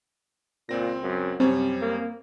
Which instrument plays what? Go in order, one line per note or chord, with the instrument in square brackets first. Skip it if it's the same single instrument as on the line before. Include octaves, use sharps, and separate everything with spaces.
[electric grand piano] C#2 C4 A#6 [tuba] A#2
[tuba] F#2
[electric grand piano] F#2 G3 C#5 [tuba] C3 [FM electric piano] C4
[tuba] A#3